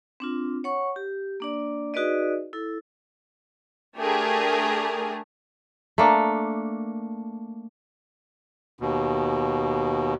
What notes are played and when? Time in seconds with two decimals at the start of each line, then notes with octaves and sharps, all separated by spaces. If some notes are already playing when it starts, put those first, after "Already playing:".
0.20 C4 D4 F4
0.64 C#5 F#5 C#6
0.96 G4
1.40 A#3 D4 D5
1.94 D#4 F#4 G#4 B4 D5 D#5
2.53 E4 A4
3.97 A3 D4 G4 G#4 A#4
5.98 A3 A#3 D4
8.79 D#2 B2